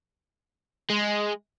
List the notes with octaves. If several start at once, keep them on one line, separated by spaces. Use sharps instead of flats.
G#3